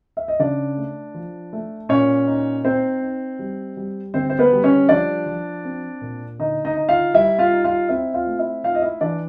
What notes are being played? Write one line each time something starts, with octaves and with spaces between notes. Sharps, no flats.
E5
D#5
C#3 D4 D5
A3
F3
A3
A#2 C#4 C#5
D#4
C4 D#4 C5
D#4
G3
G3
D3 C4 C5
C5
B3 B4
G3
C#4 C#5
F3 D4 D5
F3
C4
A#2
D3 D#4 D#5
D#4 D#5
D#4
F4 F5
G3 E4 E5
F4 F5
D#4
F4 F5
C4 E4 E5
F4 F5
A3
E4 E5
D#4 F4 F5
D#5
E4 E5
E3 D4 D5